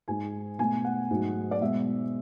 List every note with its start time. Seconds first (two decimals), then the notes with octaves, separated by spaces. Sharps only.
0.08 G#2 G#3 G#5
0.59 B2 A3 G#5
0.84 F#5
1.10 G#2 F#3 A3
1.51 D5
1.61 B2 G#3 E5